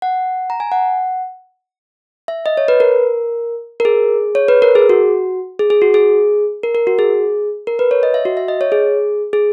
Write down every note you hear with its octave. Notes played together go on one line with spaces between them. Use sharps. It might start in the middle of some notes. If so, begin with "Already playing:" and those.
F#5
A#5
G#5
F#5
E5
D#5
C#5
B4
A#4
A#4
G#4
C#5
B4
A#4
G#4
F#4
G#4
G#4
F#4
G#4
A#4
A#4
F#4
G#4
A#4
B4
C#5
D#5
E5
F#4
E5
D#5
C#5
G#4
G#4